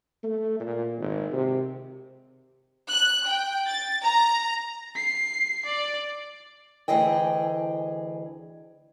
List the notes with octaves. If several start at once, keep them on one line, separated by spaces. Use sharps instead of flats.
A3
A#2
G#1
C3
F#6
G5
A6
A#5
C7
D5
D2 C#3 E3 G#4 D#5 G5